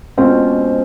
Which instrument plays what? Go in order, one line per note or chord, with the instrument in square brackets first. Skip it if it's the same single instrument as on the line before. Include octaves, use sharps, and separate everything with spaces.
[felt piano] B2 G#3 C#4 F4 [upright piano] C4